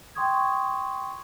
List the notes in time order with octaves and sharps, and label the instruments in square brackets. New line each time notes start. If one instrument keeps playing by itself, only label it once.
[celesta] G5 C6 C#6 D#6 G#6